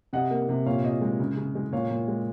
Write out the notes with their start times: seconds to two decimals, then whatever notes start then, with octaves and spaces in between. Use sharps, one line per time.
0.13 C3 D#5 F#5
0.31 A#3
0.49 C3
0.66 A#2 C#5 F5
0.84 A#2 D#5
1.02 G#3
1.20 C#3
1.37 C#3
1.55 G#3
1.72 A#2 C#5 F5
1.91 A#2
2.08 G#3